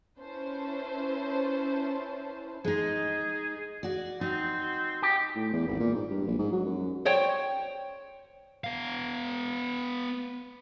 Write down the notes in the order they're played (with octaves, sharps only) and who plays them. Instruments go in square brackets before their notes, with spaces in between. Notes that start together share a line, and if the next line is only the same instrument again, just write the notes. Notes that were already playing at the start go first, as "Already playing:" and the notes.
[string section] C#4 E4 B4 C5 A5
[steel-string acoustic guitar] G#3 D#4 [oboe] G#4
[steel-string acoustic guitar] F#4 D5
[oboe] C4 [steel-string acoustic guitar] D#4 F#4
[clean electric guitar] G4
[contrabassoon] A2
E2
G#1
A#2
G#2
G2
A#1
G#2
F#3
F#2
[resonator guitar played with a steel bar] C5 C#5 G5
[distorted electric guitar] B3 F5